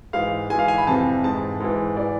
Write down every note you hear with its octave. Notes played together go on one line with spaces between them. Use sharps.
G#2 E3 F5
G#2 E3 G#5
F5
G#5
B5
F2 C3 E3 A5
G#2 E3 A5
G#2 E3
E3 D5